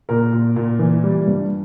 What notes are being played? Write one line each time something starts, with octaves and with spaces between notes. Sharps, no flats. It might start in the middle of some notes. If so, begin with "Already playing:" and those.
A#2 A#4
A#2
A#2
E3
G3
G2